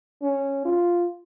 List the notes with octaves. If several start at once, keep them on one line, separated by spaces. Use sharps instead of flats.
C#4
F4